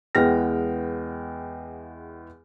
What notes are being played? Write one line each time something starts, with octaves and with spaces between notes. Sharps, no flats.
E2 G#3 B3 G5 F6 A#6